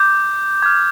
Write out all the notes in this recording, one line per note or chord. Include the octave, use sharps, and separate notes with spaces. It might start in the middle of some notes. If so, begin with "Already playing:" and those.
Already playing: D6 G6
D6 F6 G#6